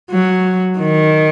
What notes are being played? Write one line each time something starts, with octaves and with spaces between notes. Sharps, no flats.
F#3
D#3